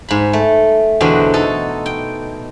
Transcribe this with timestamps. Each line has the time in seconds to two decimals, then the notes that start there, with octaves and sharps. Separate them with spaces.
0.09 G#2 B5
0.33 A3
1.01 E2 B2 D3 F#4 C5 G5
1.34 D#4 A4
1.86 G5